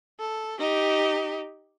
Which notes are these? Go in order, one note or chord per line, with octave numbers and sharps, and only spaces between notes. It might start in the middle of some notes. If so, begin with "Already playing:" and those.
A4
D#4 G4